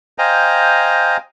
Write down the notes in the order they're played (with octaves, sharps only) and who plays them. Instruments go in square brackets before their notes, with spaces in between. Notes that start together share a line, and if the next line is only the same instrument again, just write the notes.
[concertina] C5 D#5 F5 G5 G#5 A#5